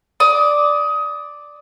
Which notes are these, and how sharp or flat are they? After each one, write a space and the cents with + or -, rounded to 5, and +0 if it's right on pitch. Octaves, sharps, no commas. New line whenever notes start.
D5 +0 D#6 +20